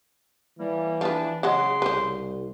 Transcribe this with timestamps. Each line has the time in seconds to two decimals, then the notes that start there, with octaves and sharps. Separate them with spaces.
0.59 A2 E3 G3 A#3
1.01 F3 D4 B4
1.43 C#3 F#3 G#3 F#4 C6
1.82 C2 B4 C5